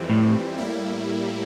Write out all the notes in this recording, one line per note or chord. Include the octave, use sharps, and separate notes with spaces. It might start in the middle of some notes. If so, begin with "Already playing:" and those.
Already playing: F2 E3 G3 C4
A2
A2 G3 A#3 E4